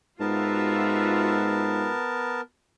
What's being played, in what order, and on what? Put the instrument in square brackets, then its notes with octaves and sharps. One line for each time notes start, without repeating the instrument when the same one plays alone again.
[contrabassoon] G#2 [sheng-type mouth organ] B3 A#4 A5 [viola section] F4 F#4 E5